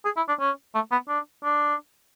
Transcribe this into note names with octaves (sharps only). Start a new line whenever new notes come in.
G#4
E4
D4
C#4
A3
B3
D4
D4